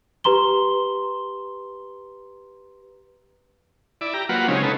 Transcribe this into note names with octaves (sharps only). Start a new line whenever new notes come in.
G4 B4 A#5 C6 G7
E4 D5
G4 A#5
F#3 A#3 F4 B4 F#5
C#3 G#3 C4 C#4 D#4
C#4 D#4 A4 B4